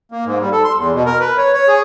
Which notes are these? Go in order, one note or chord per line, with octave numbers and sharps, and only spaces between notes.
A#3
G#2
G3
A4
C6
E2
B2
A#4
B4
C#5
C#5
G#4